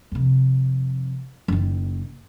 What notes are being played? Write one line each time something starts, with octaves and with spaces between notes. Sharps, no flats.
F2 C3
F#1 D#3